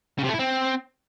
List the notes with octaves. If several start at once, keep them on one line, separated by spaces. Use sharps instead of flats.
C#3
C3
A3
E4
C4